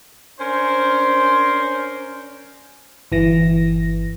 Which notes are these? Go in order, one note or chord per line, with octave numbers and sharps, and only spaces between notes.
C#4 D4 A#4 C5
G1 E3 A#6